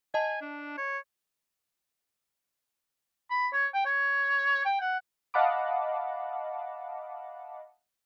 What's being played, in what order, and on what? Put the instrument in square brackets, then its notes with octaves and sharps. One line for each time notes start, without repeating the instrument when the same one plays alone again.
[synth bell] D#5 A5 [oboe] G#5
[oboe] D4
C#5
[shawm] B5
C#5
G5
C#5
G5
F#5
[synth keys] D#5 F5 F#5 A5 B5 D6